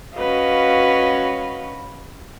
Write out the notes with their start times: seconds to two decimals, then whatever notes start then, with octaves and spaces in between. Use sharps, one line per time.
0.15 C#4 F#4 B4 D#5 F5